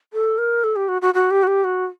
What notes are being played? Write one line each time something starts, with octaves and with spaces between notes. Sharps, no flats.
A4
A#4
A4
G4
F#4
F#4
F#4
G4
F#4
G4
F#4